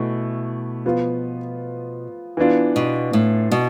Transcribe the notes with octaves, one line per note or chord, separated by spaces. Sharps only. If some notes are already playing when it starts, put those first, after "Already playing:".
Already playing: B2 E3 A3
F3 B3 F4
E3 B3 D4 F4
B2
A2
B2